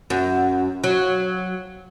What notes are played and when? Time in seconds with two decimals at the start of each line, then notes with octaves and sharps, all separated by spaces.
0.10 F#2
0.84 F#3